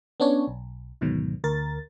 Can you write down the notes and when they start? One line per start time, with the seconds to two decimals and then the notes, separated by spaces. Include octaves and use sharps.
0.20 B3 C#4 D4 C#5
0.47 B1
1.01 D2 G#2 B2 D#3 F#3
1.44 D2 A#4 A6